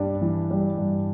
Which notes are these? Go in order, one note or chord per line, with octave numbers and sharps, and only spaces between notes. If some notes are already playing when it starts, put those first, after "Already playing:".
Already playing: G2 G3 D4
E3
G3
G2